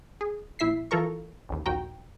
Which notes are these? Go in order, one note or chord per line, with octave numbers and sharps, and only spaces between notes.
G#4
A#1 E4 E5 B6 C7
E3 F4 A4 A#4 A#5 C#6
A1 D#2
A#1 D#2 F#4 G5 A#5